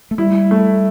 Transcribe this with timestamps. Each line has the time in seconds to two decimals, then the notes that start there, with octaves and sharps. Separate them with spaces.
0.11 A3
0.18 G3 E4
0.51 A3